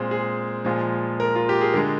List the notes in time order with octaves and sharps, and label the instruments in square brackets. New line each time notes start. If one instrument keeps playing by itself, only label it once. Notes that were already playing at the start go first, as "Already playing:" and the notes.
Already playing: [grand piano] A#2 G#3 C4
G#4
A#2 F3 G#3
A#4
F4
G4
G#4
D3 G#3 A#4